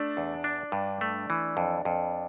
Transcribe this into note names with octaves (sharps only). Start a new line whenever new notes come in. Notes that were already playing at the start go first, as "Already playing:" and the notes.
Already playing: A3 D4
E2
D4
G2
A3
E3
F2
F2